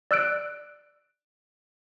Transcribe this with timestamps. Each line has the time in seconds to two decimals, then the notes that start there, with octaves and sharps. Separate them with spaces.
0.11 D5 E6 F#6 D7